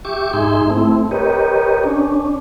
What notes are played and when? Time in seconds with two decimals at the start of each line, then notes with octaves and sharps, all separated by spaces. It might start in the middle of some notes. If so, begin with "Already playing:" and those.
0.05 G4 E5 C#6 D6
0.33 G#2 D#4 G#4 E5 C6
0.70 A3 C4 E4
1.11 G4 A#4 B4 C#5 D#5
1.84 C#4 D4